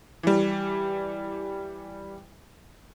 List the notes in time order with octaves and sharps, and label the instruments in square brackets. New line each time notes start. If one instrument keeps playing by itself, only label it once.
[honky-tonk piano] E3 G3